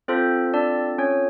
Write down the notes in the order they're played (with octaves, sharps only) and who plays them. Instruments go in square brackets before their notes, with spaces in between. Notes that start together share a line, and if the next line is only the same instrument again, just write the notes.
[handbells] C4 F4 A4 C5
D4 D5
C#4 C#5